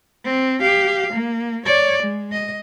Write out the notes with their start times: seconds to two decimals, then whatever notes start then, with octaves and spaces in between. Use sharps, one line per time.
0.25 C4
0.61 G4 F5
1.13 A#3
1.66 C#5 D5
2.03 G#3
2.32 D#5